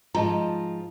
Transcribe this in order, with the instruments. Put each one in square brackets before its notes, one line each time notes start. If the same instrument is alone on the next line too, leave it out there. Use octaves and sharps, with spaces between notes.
[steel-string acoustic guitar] G#2 F3 [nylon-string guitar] F4 D#5 A5 [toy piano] A#5